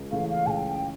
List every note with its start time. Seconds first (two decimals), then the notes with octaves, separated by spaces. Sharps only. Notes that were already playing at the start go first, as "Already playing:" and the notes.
Already playing: C#2
0.11 C#3 E3 A3 F5
0.29 F5
0.46 C#2 G5 A5